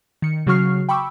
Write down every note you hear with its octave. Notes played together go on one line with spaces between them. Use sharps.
D#3 C#7
C#3 F#3 F#4 C#6 F6 C7
G5 B5 C#6 D6 E6